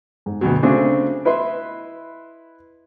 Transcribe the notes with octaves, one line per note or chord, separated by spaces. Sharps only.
G#2
D2 B2 F#3
C#3 A3 C4 D4 F#4 G#4
E4 B4 D#5 E5 C6